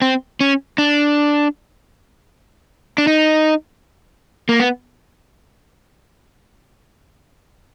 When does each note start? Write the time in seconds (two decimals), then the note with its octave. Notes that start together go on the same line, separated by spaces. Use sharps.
0.02 C4
0.41 C#4
0.78 D4
2.98 D4
3.07 D#4
4.49 A#3
4.60 B3